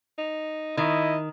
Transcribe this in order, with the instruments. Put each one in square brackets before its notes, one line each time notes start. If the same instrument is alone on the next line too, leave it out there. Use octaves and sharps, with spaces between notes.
[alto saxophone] D#4
[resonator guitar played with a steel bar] D#3 [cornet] E4 [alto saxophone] D#5